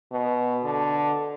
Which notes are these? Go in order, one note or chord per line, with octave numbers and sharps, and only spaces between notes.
B2
D3